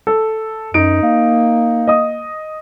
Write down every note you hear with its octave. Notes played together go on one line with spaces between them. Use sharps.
A4
F#2 D#4 D7
A#3
D#5 D#6